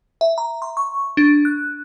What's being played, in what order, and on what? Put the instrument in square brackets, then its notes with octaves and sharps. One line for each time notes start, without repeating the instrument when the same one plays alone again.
[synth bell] E5
A#5
C6
C#6
D4
F#6